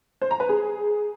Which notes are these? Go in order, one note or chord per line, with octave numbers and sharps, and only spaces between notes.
C5
A#5
B4
G#4